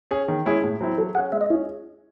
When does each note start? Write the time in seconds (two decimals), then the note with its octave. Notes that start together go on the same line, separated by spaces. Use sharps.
0.11 C#4 G#4
0.28 D#3
0.46 G#3 C#4 E4 G#4
0.64 A2
0.81 F#3 C4 E4
0.98 F#3 A4
1.15 G#4 F#5
1.18 C#4
1.32 G#3 E5
1.41 D#5
1.50 C#4 E4
1.53 G#4